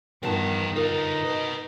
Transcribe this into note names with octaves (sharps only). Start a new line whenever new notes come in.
E2 G2 D#3 F3 B3 A5
D3 D#4 F4 A#4
B4 D#5